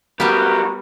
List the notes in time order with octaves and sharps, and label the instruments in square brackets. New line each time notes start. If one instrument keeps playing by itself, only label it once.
[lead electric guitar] B1 G4 [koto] G3 B3 [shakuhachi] F#4 [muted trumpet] A#4